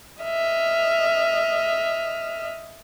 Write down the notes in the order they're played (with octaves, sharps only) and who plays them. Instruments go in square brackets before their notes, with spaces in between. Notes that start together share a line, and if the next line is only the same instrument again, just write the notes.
[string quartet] D#5 E5 F6